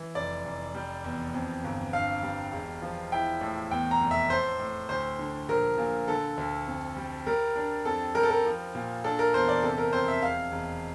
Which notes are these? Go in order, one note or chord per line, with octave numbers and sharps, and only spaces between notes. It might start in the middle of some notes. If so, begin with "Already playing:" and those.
Already playing: E3
F1 D5
F1
G3
E2
F2
G1
G2 F5
G3
E1
F3
E4 G5
A2
E2 G5
A#5
F1
E5
A2 C5
A2
D2 C5
D3
A#1 A#4
A#2
D3 A4
D2
F2
G3
G3 A#4
D4
F2 A4
G3 A#4
A4
A#4
F3
A#2
D4 A4
A#4
E2 C5
D5
C3 A4
A#4
F2 C5
E5
E1 F5
E1